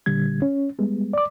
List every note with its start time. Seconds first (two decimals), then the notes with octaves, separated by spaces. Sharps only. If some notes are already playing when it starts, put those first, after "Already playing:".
0.06 A#2 D3 G3 G#6
0.42 C#4
0.79 G3 G#3 B3
1.13 D5 D6